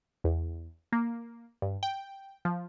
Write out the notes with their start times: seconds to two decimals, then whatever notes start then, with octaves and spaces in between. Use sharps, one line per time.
0.24 E2
0.92 A#3
1.62 G2
1.83 G5
2.45 F3